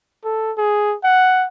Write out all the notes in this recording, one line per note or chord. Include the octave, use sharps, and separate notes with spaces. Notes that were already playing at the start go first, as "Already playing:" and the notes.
A4
G#4
F#5